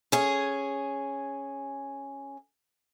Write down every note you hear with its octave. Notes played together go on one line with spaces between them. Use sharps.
C#4 G#4